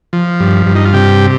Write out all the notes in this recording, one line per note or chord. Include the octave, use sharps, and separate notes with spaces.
F3
G2
G2
D#4
F4
C3 G4